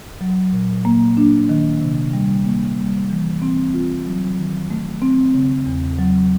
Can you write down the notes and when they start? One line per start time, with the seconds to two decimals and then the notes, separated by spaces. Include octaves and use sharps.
0.21 F#3
0.53 A#2
0.85 A#3
1.17 D4
1.49 D#3
1.81 C3
2.13 G3
2.45 A#3
2.78 G3
3.10 E3
3.42 C4
3.74 F4
4.06 F#3
4.38 D#3
4.70 A3
5.02 C4
5.34 C#3
5.66 E2
5.99 F#3